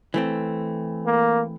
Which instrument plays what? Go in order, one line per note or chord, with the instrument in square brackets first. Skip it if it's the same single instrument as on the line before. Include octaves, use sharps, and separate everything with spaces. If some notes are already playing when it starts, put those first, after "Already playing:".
[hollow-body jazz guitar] E3 A3 C4
[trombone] A#3